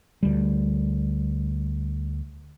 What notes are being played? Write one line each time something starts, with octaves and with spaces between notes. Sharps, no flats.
D2 G3